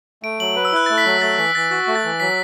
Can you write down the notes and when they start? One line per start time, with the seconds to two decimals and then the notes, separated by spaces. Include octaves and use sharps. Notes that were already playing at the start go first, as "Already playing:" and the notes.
0.23 A3 D7
0.40 F#3 F#7
0.56 B4
0.65 E6
0.72 E4 F#6
0.86 A3 A6
0.98 B6
1.05 F#3
1.21 A3 A6
1.38 E3 B6
1.55 E3 A6
1.70 F#4 A6
1.87 A3
1.95 A6
2.04 E3
2.20 F#3 B6